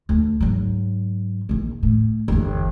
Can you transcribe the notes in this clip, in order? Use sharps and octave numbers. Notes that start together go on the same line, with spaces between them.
D2
G#2 F#3
A#1 D#3
A2
G1 E2